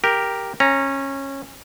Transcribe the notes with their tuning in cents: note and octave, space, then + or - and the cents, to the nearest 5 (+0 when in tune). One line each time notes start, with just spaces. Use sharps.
G4 +0 A#4 +0
C#4 -20 A#5 +0